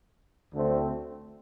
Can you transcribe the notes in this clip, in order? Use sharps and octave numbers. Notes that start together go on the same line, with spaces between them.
D2 D3 A3 C4